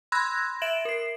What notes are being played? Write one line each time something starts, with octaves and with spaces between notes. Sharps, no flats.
B5 C6 E6 F#6 G#6 A#6
E5 D7 E7 F#7
A#4 C7